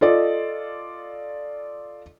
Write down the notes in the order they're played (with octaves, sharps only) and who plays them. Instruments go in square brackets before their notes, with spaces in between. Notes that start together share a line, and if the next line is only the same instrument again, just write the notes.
[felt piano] F4 A4 D5 D#5